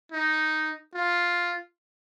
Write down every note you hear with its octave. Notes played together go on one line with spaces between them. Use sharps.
D#4
F4